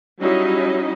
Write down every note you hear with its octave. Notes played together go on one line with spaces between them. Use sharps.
F#3 G3 C#4 D#4 E4 D#5